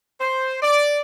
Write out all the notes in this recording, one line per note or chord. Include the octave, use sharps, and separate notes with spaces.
C5
D5